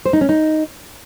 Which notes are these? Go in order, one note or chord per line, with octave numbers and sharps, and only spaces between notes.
C5
D#4
C#4
D#4